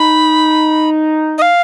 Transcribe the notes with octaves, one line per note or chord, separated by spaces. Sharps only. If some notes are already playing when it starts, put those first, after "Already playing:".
Already playing: D#4 B5
D#5
F5